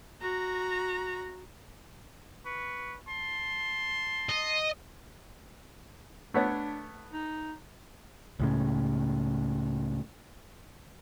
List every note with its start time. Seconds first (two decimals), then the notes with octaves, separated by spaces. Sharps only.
0.21 F#4 A#5
2.46 B4 C#6
3.08 A5 C6
4.29 D#5
6.34 A3 B3 D4 C#5
7.12 D#4
8.39 C#2 A2 C#3